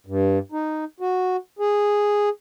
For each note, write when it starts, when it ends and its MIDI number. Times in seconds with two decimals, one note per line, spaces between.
0.06 0.39 43
0.52 0.84 63
1.00 1.37 66
1.59 2.29 68